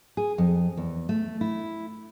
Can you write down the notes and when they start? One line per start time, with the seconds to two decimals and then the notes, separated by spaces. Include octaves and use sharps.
0.17 G#4
0.38 F2
0.77 E2
1.09 A3
1.41 E4